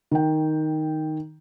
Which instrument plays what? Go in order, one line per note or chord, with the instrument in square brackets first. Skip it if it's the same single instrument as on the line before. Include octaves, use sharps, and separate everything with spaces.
[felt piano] D#3 G5